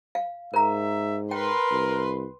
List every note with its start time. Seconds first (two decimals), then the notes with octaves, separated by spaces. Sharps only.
0.15 F5
0.54 G#2 A#4 E5 A#5
1.31 A#4 B4 G5 C6
1.71 C2